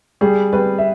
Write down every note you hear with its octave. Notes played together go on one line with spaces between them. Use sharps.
G3 G#4
G3 B4
E5